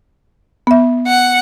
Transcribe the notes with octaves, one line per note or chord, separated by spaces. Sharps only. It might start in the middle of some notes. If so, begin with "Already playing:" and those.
B3 E5
F#5